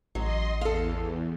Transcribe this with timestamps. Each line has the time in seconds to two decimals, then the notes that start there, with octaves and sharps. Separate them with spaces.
0.15 A1 F#3 D#5 C6
0.61 E2 A4 F5